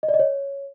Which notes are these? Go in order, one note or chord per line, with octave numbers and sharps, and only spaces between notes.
D#5
D5
D#5
C#5